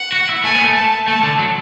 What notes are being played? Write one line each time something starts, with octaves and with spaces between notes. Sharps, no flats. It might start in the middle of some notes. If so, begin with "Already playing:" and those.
Already playing: F#5
F#4
E4
A3 G#5
B3
A3
A5
A3 A5
D3
F#3